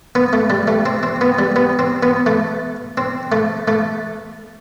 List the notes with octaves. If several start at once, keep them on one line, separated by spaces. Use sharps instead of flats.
B3
A3
G3
A3
C4
C4
B3
G3
B3
C4
B3
A3
C4
A3
A3